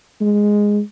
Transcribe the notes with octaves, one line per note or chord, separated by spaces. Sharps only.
G#3